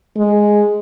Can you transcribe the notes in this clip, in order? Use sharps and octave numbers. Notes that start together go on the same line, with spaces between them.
G#3